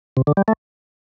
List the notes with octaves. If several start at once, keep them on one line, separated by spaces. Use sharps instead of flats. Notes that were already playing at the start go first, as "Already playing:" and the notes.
C3
D3
G3
A3